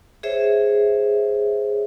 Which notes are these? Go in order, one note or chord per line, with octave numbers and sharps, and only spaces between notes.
G#4 C5 C#5 E5